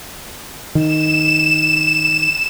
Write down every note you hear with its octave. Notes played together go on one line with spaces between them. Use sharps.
D#3 E7